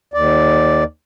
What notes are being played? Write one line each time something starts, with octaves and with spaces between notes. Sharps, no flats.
D#2 D5